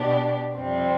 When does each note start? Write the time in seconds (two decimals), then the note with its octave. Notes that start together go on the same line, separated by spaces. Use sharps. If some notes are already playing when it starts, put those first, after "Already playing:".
Already playing: B2 B3 D4 G4
0.56 F2 C3 G3 C4